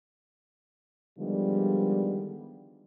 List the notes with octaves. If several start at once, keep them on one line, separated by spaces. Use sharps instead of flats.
D3 D#3 F3 G3 G#3 B3